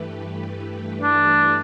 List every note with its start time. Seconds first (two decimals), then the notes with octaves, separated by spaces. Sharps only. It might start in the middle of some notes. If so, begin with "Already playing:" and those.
Already playing: G2 E3 A3 G4 B4
1.01 D4